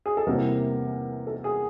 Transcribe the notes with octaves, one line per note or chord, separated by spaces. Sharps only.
G#4
A4
E2 C3 E3 G3 A#3 A#4
A4
G#4